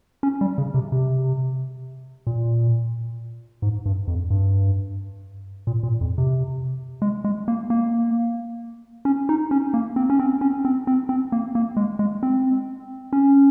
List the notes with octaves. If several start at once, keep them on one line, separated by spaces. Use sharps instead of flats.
C#4
G3
C#3
C3
C3
A#2
G#2
G2
F2
G2
A#2
A#2
F2
C3
G#3
G#3
A#3
A#3
C#4
D#4
C#4
A#3
C4
C#4
C4
C#4
C4
C4
C4
A#3
A#3
G#3
G#3
C4
C#4